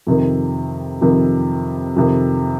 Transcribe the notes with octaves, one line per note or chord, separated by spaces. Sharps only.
F2 C3 D#3
F2 C3 D#3
F2 C3 D#3